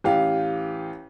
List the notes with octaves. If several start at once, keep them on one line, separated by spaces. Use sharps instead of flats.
A1 G4 F5